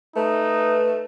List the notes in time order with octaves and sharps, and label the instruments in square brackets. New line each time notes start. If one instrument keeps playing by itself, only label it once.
[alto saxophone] A3 [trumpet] D#4 [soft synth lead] B4